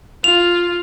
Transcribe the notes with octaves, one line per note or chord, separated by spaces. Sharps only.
F4 F7